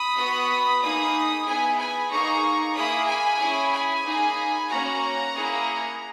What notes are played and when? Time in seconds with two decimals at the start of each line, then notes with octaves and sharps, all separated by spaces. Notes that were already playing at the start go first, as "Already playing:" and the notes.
Already playing: B5 D#6
0.17 B3 F#4
0.81 A#3 D#4 G#4 B5 D#6
1.46 B3 E4 G#4 G#5 B5
1.77 G#5 B5
2.10 A#3 D#4 G#4 A#5 C#6
2.75 A#3 E4 G#4 B5 D#6
3.07 G#5 B5
3.39 C#4 E4 G#4
3.72 G#5 B5
4.03 A#3 D#4 G#4
4.69 A#3 C#4 F#4 F#5 A#5
5.34 A#3 E4 G#4